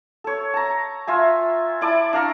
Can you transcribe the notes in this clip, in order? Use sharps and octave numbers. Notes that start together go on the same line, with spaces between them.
A4 C#5
A5 A#5
F4 E5 G#5
E4 D5 A5
D4 F5 A#5 C#6